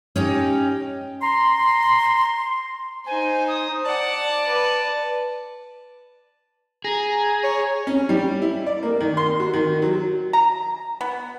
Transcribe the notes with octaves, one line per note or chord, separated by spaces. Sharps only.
C#4 D#4 G4
A#5 C6
D#4 C5 G#5
D#6
D5 F#5 A5
B4
G#4 A#5
C#5
C#4
G3
E4
D5
A#3
D#3
C6
F#4
D#3
F#3
A#5
B3